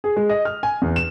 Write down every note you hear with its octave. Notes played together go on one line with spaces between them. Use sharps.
G#4
G#3
D#5
F6
G#5
E2
E7